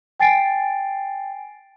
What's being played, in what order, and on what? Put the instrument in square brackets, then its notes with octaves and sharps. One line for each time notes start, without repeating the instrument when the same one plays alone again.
[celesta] G5 G#5 A6 C7 D7